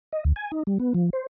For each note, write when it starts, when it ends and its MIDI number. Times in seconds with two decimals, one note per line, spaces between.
0.12 0.24 75
0.25 0.33 38
0.36 0.51 80
0.52 0.63 63
0.67 0.78 55
0.80 0.93 59
0.94 1.10 53
1.13 1.26 72